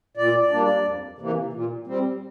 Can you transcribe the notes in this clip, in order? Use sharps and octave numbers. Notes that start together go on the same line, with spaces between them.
A#2 D5
D5
G3 A#3 D4
D5
F2
C3 E3 A#3
A#2
G3 C4